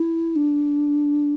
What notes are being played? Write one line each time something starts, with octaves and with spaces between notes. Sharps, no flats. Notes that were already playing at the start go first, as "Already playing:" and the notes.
Already playing: E4
D4